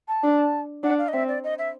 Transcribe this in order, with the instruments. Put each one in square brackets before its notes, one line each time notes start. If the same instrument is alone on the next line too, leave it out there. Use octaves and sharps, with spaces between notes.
[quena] A5
[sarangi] D4
[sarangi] D4 [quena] F#5
[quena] F5
D#5
[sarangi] C4 [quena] E5
[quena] D5
D#5
E5